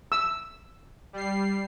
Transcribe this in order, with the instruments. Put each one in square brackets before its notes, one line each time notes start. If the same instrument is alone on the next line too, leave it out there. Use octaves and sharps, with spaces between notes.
[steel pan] E6
[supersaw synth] G3 C7